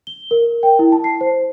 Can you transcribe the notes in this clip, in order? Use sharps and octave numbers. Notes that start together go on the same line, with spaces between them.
G7
A#4
G5
E4
A5
C7
C5